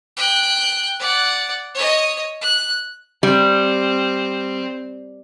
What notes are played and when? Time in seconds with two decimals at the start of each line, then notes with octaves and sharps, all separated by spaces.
0.17 G5 F#6
0.99 D5 F#5
1.74 C#5 D#5
2.41 F#6
3.23 G3 C4